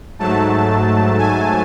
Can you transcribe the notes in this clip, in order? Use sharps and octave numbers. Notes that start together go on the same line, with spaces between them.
G#2 F#3 A3 A5
G#5